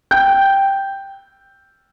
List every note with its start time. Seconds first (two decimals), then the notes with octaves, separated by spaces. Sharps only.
0.11 G5 G6